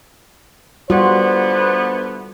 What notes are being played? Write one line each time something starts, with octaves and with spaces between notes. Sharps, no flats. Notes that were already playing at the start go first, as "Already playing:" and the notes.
D3 G3 A3 B3 F4 F#4 C5